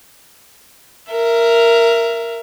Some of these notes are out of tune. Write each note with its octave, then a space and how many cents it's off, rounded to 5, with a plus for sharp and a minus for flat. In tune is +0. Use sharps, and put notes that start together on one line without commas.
A#4 +0 E5 +20